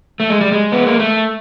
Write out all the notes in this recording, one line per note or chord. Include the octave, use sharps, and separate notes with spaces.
A3
G#3
G3
G#3
B3
A#3
A3